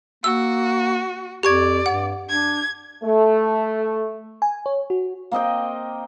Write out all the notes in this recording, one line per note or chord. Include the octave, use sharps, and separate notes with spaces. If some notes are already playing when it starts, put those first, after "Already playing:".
A#3 F#4 E6
F2 G4 D5 C#6 G#6
G2 F#5
D4 G#6
A3
G#5
C#5
F#4
A#3 C4 D#5 G5